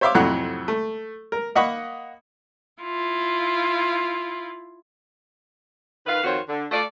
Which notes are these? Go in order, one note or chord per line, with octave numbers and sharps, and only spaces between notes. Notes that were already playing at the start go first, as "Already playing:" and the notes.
C5 C#5 E5 F5 C6 D6
F2 A2 C3 F#3 F#5 F#6
A3
A#4
A#3 D#5 F#5 B5 C#6
E4 F4
D#3 B4 F5
F2 D#3 F4 F#4 C5 C#5
D3
A3 F4 D5